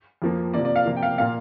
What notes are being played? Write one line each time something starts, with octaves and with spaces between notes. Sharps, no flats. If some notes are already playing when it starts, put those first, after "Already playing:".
F2 F3 A#3
C3 F3 A#3 D5
D5
F5
C3 F3 A#3
G5
F5
A#2 A#3 F5